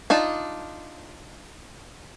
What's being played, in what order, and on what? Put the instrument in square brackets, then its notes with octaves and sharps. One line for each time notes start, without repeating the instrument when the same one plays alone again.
[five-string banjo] D4 D#4 F4 A5